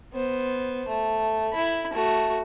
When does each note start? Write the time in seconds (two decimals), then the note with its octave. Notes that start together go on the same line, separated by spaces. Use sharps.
0.14 B3 C5
0.88 A3
1.53 E4 B5
1.93 A3 F#4